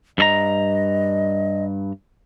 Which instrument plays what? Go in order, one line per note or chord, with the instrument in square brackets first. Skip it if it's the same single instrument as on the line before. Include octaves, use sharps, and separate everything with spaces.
[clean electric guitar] G2 A4 A#5 [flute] D#5